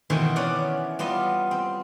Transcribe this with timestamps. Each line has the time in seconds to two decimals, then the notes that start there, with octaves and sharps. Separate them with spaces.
0.10 B2 D#3 E3 C4
0.36 B3 C#4 D5 F#5
0.99 G3 B3 F4 D#5
1.51 C4